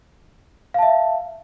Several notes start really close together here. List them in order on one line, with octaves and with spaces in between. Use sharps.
F5 A5 E5